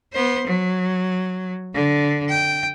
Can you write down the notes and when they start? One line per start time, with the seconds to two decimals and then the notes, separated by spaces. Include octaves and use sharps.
0.13 B3 C5
0.47 F#3
1.74 D3
2.29 G5